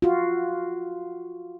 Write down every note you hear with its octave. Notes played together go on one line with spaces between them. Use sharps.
F4 F#4